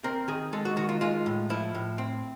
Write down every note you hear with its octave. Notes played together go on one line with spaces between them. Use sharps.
C4 A#4
D#3 G#4
G#3 A4
F#4
D#3 F#4
F4
G#3 F4
A2
F3 E4
A2
C4